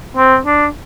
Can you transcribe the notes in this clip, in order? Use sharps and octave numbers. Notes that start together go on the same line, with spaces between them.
C4
D4